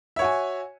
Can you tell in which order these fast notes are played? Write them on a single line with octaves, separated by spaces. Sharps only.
E5 C#5 F#4 G#5